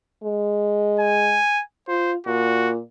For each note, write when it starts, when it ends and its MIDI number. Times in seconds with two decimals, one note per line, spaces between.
0.23 1.39 56
1.00 1.63 80
1.88 2.16 65
1.88 2.12 72
2.27 2.79 46
2.27 2.71 66